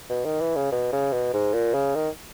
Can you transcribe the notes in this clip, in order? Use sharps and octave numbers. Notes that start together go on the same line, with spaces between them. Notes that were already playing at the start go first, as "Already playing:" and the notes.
B2
D#3
E3
C#3
B2
C#3
B2
G#2
A#2
C#3
D#3